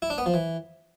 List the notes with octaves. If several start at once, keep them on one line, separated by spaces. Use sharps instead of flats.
E4
D4
B3
F3
E3